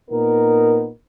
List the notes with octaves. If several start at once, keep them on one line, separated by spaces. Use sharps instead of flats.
A#2 B3 D#4 A#4